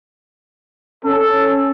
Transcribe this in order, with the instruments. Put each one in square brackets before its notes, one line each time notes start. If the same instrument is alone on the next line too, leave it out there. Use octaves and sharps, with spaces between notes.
[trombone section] C#4 [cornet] A4